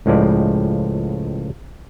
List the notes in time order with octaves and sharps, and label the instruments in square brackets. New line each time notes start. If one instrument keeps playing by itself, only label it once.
[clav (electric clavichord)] C#2 A2 F3 G#3 D5